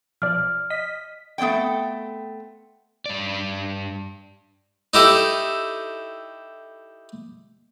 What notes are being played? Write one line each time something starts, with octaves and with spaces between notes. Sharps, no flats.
B1 F3 D5 F6
D#5 B6
A3 B3 C4 D5 G5
G2 D5
D#4 E4 G4 A4